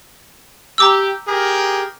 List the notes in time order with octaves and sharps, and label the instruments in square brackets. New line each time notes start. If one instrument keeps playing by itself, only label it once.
[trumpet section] G4 [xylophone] A#5 D6 E6
[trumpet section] G4 G#4 A#4